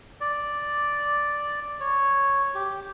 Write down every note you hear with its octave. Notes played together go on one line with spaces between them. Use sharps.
D5
C#5
G4